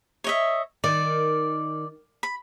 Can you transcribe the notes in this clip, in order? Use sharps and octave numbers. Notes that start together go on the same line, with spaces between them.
C#5 D#5 E5
D#3 D5
B5